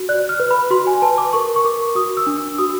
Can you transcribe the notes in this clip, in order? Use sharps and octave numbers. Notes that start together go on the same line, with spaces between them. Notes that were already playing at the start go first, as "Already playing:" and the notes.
Already playing: F#4
D5 F#6
F6
B4
B5
F#4 C6
G#5
B4 A5
D6
A#4 C#6
C#6
A#4 D6
F#4 D#6
E6
D4
E6
F#4 D#6